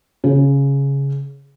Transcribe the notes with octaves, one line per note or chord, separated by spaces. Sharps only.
C#3